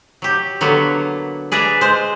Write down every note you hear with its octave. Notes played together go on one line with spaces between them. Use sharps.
F#3 G4
D3 F#3 A#3 B3
G#4 B4 D5 E5 A#5
G#3 C5